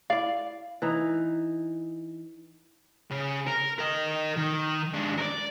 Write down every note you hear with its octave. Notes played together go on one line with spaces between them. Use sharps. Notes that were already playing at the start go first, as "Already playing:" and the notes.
E4 D5 F5
E3 D#4
C#3
A#4
A#4 D#5
D#3
G#2 D4
A#4 D5